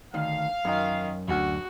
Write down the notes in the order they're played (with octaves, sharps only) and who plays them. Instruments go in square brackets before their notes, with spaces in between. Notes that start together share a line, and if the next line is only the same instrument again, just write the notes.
[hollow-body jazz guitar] D2 D#3 [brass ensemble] F5
[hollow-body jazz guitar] F#2 [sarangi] D#3
[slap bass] D2 [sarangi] F#4